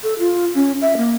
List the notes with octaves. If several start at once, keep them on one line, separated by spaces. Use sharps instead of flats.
A4
F4
C#4
E5
A#3